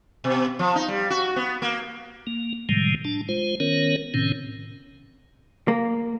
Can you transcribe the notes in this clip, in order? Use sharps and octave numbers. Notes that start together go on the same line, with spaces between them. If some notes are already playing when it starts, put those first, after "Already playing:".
B2
F3
D#4
G3
F#4
B3
A#3
A#3
A2 C3 D#3 F3 G3 G#3
D4 A5
G#3 F4 C5
D#3 B3 C#4 A#4 C#5
A2 C3 D#3 C4 C#4
A#3